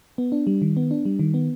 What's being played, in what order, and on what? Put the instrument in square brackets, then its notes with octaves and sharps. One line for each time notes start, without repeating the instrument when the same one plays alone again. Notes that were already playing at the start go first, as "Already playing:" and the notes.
[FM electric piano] B3
D4
G3
D#3
B3
D4
G3
D#3
B3